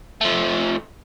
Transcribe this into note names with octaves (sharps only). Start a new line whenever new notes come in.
F3 A3